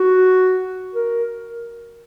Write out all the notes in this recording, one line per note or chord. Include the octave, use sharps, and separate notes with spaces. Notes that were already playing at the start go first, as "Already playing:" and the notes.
Already playing: F#4
A#4